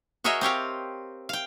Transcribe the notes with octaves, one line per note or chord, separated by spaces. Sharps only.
F#4 G#4 A#4 C#5 D#5 E5
C4 G4 C#5 F5
F5 G5